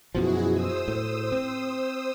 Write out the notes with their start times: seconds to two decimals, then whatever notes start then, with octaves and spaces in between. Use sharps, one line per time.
0.15 F#2 B2 F3 E4 F#4 G#4
0.52 C5 D#6 E6
0.88 A2
1.32 C4